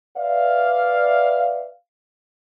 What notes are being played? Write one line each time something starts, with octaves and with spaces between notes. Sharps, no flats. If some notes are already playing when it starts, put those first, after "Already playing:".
B4 D5 E5 F5